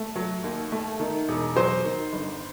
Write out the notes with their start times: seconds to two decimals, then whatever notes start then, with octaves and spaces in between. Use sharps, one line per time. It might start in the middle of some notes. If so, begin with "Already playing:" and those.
Already playing: A3
0.15 F#3
0.44 D#2
0.72 A3
1.00 D#3
1.28 E1
1.56 F#3 C5
1.85 D#3
2.13 G1